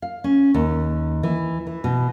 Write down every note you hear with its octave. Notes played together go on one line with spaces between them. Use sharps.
F5
C#4
D#2
E3
E3
B2